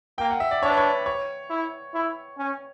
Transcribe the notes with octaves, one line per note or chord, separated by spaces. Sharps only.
A#3 G5
F#5
E5
D5
D4 C#5
B4
C#5
C#5
E4
E4
C#4